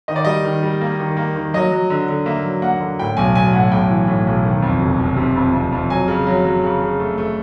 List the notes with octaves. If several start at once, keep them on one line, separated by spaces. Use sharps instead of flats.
D#3 D#5
D5
G3 D#5
D#3
G3
A#3
D#3
A#3
D#3
F#3 D#5
F#3
D3
D3
A#3 E5
F#3
A#3 F#5
D3
A2 G5
B1 G#5
B1 G#5
A2 F#5
B1 G5
E3
A2
B1
D#3
F2
F1
F1
C3
F2
F2
F2
F#3 G#5
C#3
F#3
F#3
C#3
C#3
A3
A3